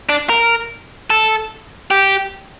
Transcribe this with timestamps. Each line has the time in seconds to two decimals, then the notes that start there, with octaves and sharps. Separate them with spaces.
0.09 D4
0.29 A#4
1.10 A4
1.91 G4